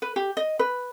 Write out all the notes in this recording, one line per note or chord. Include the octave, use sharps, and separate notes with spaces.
B4
G4
D#5
B4